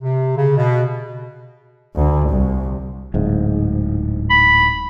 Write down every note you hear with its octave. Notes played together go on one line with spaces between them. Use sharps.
C3
C#3
B2
D2
C2
D1 G#2
B5